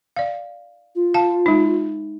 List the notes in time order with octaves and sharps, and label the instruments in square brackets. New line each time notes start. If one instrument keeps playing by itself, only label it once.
[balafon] D5 F5
[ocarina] F4
[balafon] F5 A5
G#3 D#4